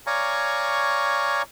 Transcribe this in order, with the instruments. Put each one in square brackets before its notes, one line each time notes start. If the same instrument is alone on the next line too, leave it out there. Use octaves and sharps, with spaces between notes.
[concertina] C#5 D5 F5 G#5 A#5 C#6